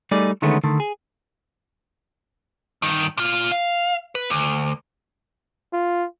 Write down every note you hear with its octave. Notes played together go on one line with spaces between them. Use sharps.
G3 A3 D#4 G#4 D5
D3 D#3 G#3 A3 B3 C#4
D3 D#3 A3
G#4
G2 D#3
A#2 F4
F5
B4
D2
F4